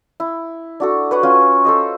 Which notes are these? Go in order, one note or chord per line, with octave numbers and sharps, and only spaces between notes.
E4
D4 F#4 A4
B4 C#5 F#5
C#4 F4 C#5 G#5
A4 C5 D#5